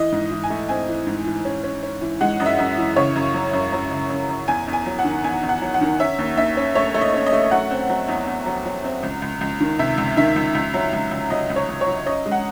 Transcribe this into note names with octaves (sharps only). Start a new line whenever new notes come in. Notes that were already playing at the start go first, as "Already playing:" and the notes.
Already playing: E3 D#5
G#2
E3
G#5
A3
C4 G#5
E3
G#2
E3
C#4
C#4
C#4
E3
G#3 F#5
F#2 D#5
E5
F#2
E3
C#3 C#5
F#2
F#3
F#2
F#3
C#3
F#2
F#2
E2 G#5
E2
G#5
F#3
F#5
D#3
E2 G#5
E2
F#5
F#3
F#5
D#3
C#4 E5
D#2
D#2 E5
C#4
A3 C#5
A3
D#5
C#4
D#5
A3
F#3 F#5
C4
F#3
E2
E2
F#3
F#3
C4
C#2
C#2
C#2
D#3
C3 E5
C#2
D#3 E5
C#2
C#2
F#3
C#2
C#2
F#3 D#5
C#2
C#5
C#2
C#5
F#3
C#4 D#5
G#3
F#5